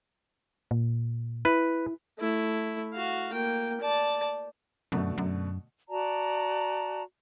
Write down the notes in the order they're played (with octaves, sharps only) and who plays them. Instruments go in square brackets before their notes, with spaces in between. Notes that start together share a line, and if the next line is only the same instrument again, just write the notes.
[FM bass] A#2
[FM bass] E4 [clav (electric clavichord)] B4
[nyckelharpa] A3 E4
F#4 F5
A#3 G5
D5 A5
[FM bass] F#2 [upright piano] B2 D3 A3
[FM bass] F#2
[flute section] F#4 D5 A5 A#5